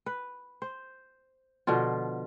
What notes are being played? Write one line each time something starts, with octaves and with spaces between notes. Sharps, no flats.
B4
C5
B2 D3 F3 F4